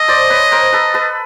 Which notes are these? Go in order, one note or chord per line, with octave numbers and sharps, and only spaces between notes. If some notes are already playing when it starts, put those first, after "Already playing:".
Already playing: A4 D#5
C5 D5
B4 C#5
A#4 C5
A4 B4
A4 B4